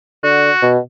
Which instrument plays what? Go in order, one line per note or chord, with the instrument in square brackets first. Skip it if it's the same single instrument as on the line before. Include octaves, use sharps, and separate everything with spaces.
[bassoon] D3 [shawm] F#4
[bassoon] B2